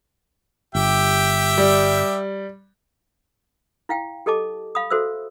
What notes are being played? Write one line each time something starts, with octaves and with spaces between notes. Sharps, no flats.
G1 G4 E5 G5
G3
E4 F5 G5
G4 A4 D#5 A5 D6
F5 B5 D#6
F#4 A4 C5 E5 E6